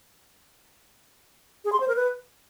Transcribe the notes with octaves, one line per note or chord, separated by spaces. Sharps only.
G#4
C6
C5
A#4
B4